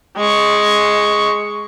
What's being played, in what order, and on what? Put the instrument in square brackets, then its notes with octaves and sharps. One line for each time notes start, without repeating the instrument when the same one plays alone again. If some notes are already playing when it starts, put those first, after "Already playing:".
[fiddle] G#3 C#6